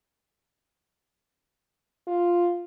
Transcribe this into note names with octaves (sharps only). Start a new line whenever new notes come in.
F4